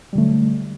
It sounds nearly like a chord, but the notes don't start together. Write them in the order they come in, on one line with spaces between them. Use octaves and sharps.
G3 D3 A3 F#3